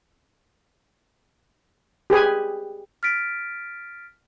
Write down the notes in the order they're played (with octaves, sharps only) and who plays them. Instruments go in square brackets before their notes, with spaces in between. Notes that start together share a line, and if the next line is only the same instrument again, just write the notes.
[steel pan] G4 G#4 B4 G#5
[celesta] F6 A6 B6 D7